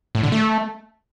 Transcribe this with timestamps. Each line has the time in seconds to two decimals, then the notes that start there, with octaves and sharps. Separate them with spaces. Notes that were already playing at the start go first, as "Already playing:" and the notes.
0.15 A2
0.23 D3
0.32 A3